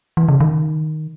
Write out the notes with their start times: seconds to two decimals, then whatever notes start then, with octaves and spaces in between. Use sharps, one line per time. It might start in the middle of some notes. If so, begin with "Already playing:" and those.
0.17 E3
0.28 C#3
0.40 D#3